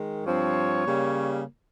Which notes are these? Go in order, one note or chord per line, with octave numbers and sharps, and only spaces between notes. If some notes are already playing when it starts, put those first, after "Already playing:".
Already playing: D#3 G#3
G2 F3 C4 C#5
C#3 G3 A#3